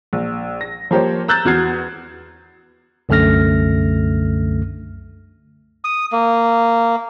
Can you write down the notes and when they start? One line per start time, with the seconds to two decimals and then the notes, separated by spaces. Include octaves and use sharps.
0.13 A#1
0.61 A#6
0.91 F3 A#3 G4 C5 C#5
1.28 A#5 E6 F#6 G6 A6 E7
1.45 E2 F#4 F6 G#6 C7
3.09 C2 F#2 D3 A3 F6 A#6
5.85 D#6
6.12 A#3